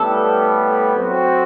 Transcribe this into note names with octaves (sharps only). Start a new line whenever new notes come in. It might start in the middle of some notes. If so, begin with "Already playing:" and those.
Already playing: A2 G3 B3 A4
F#3 C4 F#4